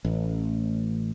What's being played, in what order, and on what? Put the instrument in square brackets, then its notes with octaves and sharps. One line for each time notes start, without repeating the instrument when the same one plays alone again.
[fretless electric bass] A1